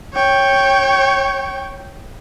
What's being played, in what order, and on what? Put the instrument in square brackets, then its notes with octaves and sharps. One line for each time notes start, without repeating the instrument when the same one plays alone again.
[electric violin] C#5 G5